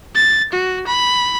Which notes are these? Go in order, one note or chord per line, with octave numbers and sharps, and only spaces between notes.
A6
F#4
B5